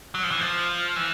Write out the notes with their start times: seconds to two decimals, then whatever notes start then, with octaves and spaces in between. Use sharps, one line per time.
0.15 F#3
0.23 F3
0.31 E3
0.40 F3
0.96 E3